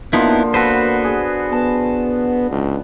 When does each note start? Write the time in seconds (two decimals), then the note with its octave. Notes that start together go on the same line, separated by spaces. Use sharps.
0.13 D3 F3 A#3 B3 D#4 E4
0.54 B3 F#4 A4 B4 C5
1.04 G#4
1.52 B3 A5
2.51 C#2